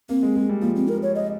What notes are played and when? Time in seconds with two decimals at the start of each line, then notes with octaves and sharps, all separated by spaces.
0.09 A#3 C4
0.23 G#3
0.36 G#3
0.49 G3
0.62 F3 A#3
0.76 C4
0.88 A#4
1.02 C#5
1.15 D#5